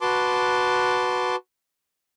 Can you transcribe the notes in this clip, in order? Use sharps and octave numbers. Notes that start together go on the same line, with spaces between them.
F#4 B4 A5 C6 D6